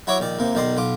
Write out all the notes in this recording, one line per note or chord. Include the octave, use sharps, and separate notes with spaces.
F#3 E4 F#4 C#5 E5 D6
A#1 D#3 D5
D#2 C3 A#3
B1 D#3 D5 D#5 C6
B1 F4 D6